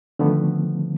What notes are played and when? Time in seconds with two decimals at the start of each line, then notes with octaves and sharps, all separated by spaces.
0.19 D3 D#3 F3 A3 B3